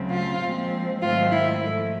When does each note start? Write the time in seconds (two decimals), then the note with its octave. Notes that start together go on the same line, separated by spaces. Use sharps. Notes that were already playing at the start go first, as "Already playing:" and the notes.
Already playing: D2 C#3 F#3 A3 C4
0.11 F4
0.41 A#2 F3 G#3 C4
1.01 G#2 D#3 F#3 A3 C4 F4
1.31 E4
1.61 G#2 F3 A3 E4